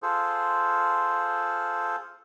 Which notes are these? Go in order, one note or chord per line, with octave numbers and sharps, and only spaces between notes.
F4 G#4 A4 C5